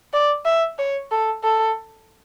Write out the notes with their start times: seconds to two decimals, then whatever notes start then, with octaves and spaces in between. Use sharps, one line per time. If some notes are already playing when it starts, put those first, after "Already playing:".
0.13 D5
0.46 E5
0.79 C#5
1.12 A4
1.44 A4